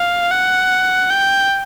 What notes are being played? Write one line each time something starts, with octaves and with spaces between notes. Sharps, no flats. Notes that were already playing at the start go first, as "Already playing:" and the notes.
Already playing: F5
F#5
G5